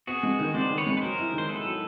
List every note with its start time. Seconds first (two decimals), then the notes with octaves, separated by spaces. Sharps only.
0.07 B3 F#4 G#4
0.23 G#3
0.39 D#3
0.54 G#3 C5 D5
0.70 D#3
0.78 B4 C#5
0.87 G#3
0.97 B4
1.02 F#3 A#4 C5
1.18 E4
1.33 D#3
1.38 C5
1.49 B3 A4 B4
1.65 F#3